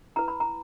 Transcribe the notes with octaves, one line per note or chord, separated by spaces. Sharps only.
E4 B4 A#5
B5
A#5